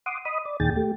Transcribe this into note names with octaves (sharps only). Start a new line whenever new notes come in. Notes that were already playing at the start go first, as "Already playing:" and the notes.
F#5 C6 D6 D#6
D#5 B5 D#6
D5
D#2 A#2 D#3 G#4 G5 A6
A3 G4